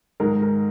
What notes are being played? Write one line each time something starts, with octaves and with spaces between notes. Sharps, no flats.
G#2 D#3 G#3 A#4
A#4